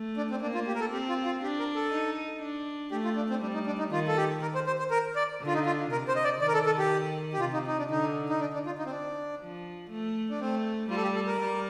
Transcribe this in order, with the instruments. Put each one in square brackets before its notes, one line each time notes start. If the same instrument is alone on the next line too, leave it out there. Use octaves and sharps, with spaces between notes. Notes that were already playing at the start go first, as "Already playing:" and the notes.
Already playing: [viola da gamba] A3
[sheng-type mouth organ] D4
C4
[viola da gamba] A#3 [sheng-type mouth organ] D4
[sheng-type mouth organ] F4
G4
A#4
A4
[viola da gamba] C4 [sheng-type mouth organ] G4
[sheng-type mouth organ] F4
F4
[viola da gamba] D4 [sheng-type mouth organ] G4
[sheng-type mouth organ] A#4
A4
[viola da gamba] D#4
D4
[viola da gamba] A3 [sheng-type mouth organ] G4
[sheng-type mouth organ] F4
D4
C4
[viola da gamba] G3 [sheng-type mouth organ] D4
[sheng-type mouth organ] D#4
D4
D#4
[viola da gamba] D#3 [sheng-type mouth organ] F4
[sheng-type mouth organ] A4
G4
A#4
C5
C5
C5
A#4
D5
[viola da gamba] D3
[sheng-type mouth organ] F4
D#4
F4
[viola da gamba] C3 [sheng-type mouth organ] A#4
[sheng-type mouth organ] C5
D#5
D5
[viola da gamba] D#3 [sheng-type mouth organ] D5
[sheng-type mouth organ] A#4
A4
A4
G4
G4
[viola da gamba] C3 [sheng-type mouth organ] F4
[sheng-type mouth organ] D#4
D#4
D4
[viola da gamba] D3 [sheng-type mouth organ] D#4
[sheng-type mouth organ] D#4
D4
D4
F4
D#4
C4
D4
[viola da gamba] F3
A3
[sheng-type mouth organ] D4
[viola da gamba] A3 [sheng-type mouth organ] C4
[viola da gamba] G3 [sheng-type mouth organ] F4
[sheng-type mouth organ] A4
G4
A4
A#4
[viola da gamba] G3